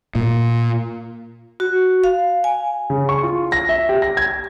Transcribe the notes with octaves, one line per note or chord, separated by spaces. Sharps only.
A#2
F#4
F5
G#5
C#3
C#6
F4
A#6
E5
G4
A#6
G#6